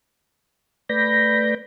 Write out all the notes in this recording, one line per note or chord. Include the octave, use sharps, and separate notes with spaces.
A3 B4 D5 B5 G6 A#6